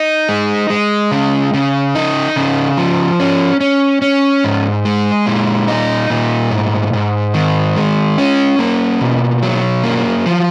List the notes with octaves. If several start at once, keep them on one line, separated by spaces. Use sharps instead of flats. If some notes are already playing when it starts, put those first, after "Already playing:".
Already playing: D#4
G#3
G#3
C#3
C#3
D#4
C#3
F3
C#4
C#4
C#4
G#2
G#3
A#2
D#4
A#2
G#2
G#2
D#3
G#3
C#4
A#3
B2
F#3
A#3
F3